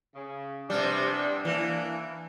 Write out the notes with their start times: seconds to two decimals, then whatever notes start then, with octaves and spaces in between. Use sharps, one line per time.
0.16 C#3
0.70 C3 E3 G3 B3 D4
1.45 E3 A#3 D4